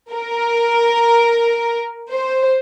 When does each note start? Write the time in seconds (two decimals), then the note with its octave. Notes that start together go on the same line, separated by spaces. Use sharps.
0.12 A#4
2.10 C5